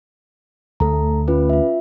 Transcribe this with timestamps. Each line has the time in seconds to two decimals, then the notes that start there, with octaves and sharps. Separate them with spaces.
0.80 D2 A3 A4 A#5
1.28 C#4 F4 B4
1.49 F4 E5